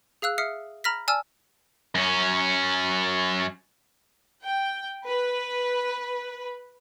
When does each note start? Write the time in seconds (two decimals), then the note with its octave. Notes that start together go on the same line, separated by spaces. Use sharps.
0.22 G#4 F5 E6 F#6
0.38 E5 D#6 F6 C7 C#7
0.84 A#5 B5 F6 A#6 B6
1.08 D5 G#5 A5 E6 F6
1.95 F#2 C#4
4.43 G5
5.07 B4